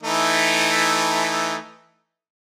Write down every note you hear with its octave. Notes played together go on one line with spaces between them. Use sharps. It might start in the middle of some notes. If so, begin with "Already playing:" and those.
E3 A3 D#4